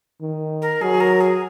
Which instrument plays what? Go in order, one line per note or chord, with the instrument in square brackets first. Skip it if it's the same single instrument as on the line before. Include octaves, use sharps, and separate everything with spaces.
[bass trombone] D#3
[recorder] A#4
[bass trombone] F#3 [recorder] G#4
[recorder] A#4
G#4